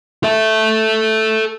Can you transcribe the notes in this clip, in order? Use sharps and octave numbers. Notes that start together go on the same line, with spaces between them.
A4 E5